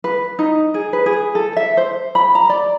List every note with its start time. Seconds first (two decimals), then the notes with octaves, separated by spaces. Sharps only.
0.04 B4
0.39 D#4
0.74 G#4
0.93 B4
1.06 G#4
1.35 A4
1.56 E5
1.77 C5
2.15 B5
2.35 A#5
2.49 D5